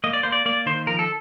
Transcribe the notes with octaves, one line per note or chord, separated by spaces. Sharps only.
A#3 D#5
D5
A#3 C5
D5
A#3 D5
D#3 C5
F3 A#4
A4